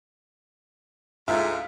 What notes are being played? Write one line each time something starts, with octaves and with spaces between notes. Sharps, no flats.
D2 G#2 E4 F4 E5